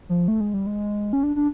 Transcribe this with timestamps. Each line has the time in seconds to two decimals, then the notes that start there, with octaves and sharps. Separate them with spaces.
0.09 F3
0.28 A3
0.40 G#3
0.54 G3
0.67 G#3
1.13 C#4
1.23 D4
1.36 D4